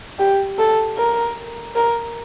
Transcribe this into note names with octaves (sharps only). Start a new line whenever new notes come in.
G4
A4
A#4
A#4